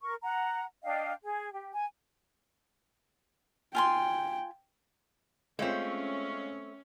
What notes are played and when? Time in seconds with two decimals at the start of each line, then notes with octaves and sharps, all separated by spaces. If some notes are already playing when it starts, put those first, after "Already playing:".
0.01 A#4 C#6
0.22 F#5 A#5
0.83 D4 D#5 F5 G5
1.23 G#4
1.52 G4
1.74 G#5
3.75 F4 G5 G#5 C6
5.59 G#3 A3 C4 C#4 F4